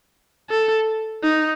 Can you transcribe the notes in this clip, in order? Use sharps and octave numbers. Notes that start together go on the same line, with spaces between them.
A4
D#4